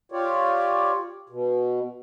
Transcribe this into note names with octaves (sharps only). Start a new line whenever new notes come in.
F4 G4 C#5 D5
B2